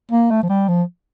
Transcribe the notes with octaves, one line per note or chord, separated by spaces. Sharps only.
A#3
A3
F3
G3
F3